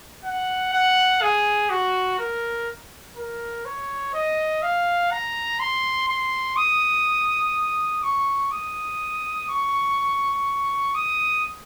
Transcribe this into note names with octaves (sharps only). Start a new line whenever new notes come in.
F#5
F#5
G#4
F#4
A#4
A#4
C#5
D#5
F5
A#5
C6
C6
D#6
C#6
D#6
C#6
D#6